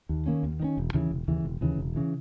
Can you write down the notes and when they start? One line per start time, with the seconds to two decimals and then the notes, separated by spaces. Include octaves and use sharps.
0.09 D#2
0.26 D#3 A#3 C#4
0.43 D#2
0.60 D#3 A#3 C#4
0.77 E1
0.94 D#2 C#3 E3
1.11 E1
1.28 D#2 C#3 E3
1.45 E1
1.61 D#2 C#3 E3
1.78 E1
1.96 C#3 E3